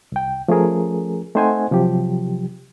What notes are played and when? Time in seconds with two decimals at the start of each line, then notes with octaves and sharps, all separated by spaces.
0.12 C2 G5
0.48 F3 A3 C#4 G#4 A#4
1.35 A3 C4 D#4 C5 F#5 G#5
1.71 C3 F3 F#3 G4